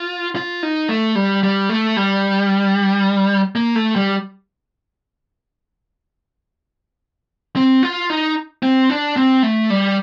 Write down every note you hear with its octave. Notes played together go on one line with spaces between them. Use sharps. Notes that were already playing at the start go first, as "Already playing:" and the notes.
Already playing: F4
F4
D#4
A3
G3
G3
A3
G3
A#3
A3
G3
C4
F4
D#4
C4
D4
C4
A3
G3